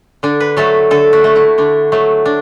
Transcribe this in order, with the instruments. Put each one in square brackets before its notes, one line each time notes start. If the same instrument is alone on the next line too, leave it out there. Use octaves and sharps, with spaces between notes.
[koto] D3 D4
B4
F#3 A3 A4
D3 A4
F#4
A3
E4
D3 D4
F#3 A3
D4